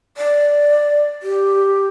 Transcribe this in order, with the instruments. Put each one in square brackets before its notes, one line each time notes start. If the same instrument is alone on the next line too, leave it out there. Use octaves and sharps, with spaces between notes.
[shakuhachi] D5
G4